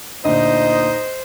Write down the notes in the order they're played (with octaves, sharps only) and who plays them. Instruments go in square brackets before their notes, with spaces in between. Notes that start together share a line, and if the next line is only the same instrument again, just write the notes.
[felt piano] D2 A#2 [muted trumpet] D#4 [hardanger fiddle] C5 [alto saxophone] D#5